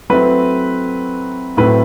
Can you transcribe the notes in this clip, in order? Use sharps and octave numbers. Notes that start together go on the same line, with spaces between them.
F#3 A3 C4 E4 B4
A2 F#3 A3 C4 B4